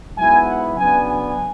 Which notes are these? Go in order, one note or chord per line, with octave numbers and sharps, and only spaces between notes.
G#2 F#3 B3 E4 G#5
F#5
C#3 F#3 B3 D4 G#5
G#5